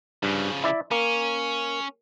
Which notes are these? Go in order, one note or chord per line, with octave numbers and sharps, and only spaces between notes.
G2 C#3 F3
E4 D5 E5
A#3 C#4